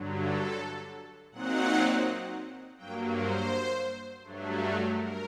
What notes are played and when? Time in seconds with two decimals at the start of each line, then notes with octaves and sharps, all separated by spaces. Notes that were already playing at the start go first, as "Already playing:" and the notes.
Already playing: G2 D3 F#3
0.22 A4
1.32 A#2 F#3 C4 D#4 F#5
2.78 G2 F#3 A#3 G5
3.14 C5
4.24 G2 F#3 A3
4.97 A#4